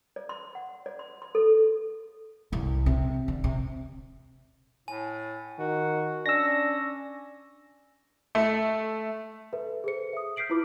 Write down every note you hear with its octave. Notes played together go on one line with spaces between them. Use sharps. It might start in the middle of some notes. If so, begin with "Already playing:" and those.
D5
C6
F#5
D5
C6
C6
A4
C2
C3
D3
C3
A2 G#5
D#3 F#4
C#4 D4 E6 A#6
A3
A4 B4 E5
G#4 A4 C5 C#7
E5 D#6
F6 G6 B6 C7 D7 F#7
E4 F4 B4 B5 D6